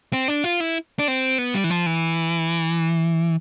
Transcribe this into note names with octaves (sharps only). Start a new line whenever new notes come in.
C4
D4
F4
E4
D4
C4
B3
G3
E3
F3
E3